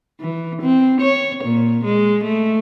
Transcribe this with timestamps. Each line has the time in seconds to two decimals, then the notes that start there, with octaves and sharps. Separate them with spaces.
0.21 E3
0.62 C4
1.01 C#5
1.44 A#2
1.84 G#3
2.24 A3